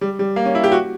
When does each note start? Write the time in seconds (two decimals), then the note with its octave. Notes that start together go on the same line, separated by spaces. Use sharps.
0.01 G3
0.19 G3
0.36 A#3
0.45 C#4
0.55 E4
0.64 G4
0.72 F#4